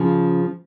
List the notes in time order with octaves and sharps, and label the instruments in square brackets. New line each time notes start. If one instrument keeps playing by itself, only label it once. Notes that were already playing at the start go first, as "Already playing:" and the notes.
Already playing: [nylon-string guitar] C#3 F3